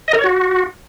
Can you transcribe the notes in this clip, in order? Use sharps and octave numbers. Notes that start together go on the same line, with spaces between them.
D#5
A#4
C#5
F#4